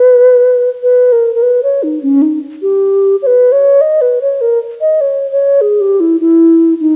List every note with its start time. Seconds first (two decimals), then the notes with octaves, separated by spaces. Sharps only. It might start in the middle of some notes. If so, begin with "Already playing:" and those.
Already playing: B4
0.83 B4
1.12 A#4
1.34 A#4
1.42 B4
1.63 C#5
1.83 D#4
2.03 C#4
2.22 D#4
2.62 G4
3.22 C#5
3.27 B4
3.52 C#5
3.81 D#5
4.01 B4
4.21 C#5
4.41 A#4
4.81 D#5
5.01 C#5
5.31 C#5
5.61 G#4
5.81 G4
6.00 E4
6.21 E4
6.81 D#4